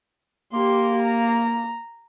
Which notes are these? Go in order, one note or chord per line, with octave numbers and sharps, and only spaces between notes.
A#3 G4 C6
A#5